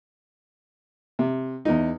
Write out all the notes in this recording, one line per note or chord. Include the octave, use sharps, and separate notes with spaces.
C3
E2 D#4